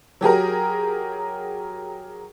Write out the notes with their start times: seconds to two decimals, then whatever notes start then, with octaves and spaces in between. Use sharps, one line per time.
0.21 F#3 G4 G#4 A#4